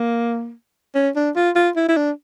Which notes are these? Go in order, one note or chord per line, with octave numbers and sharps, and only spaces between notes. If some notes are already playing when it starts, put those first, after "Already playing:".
Already playing: A#3
C#4
D4
F4
F4
E4
E4
D4